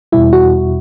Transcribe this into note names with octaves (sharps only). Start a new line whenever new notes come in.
E2 B2 G3 E4
F#4